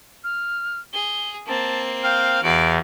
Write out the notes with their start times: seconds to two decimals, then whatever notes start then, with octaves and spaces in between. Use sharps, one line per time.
0.24 F6
0.93 G#4 G7
1.47 A#3 C4 A5
2.04 F5 G5
2.43 E2 F#4 F5 D7